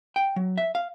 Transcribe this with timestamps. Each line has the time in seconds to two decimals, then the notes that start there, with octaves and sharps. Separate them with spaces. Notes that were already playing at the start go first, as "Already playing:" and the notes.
0.16 G5
0.36 F#3
0.58 E5
0.75 F5